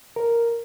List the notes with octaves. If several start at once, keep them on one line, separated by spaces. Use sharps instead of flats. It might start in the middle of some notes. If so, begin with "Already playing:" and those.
A#4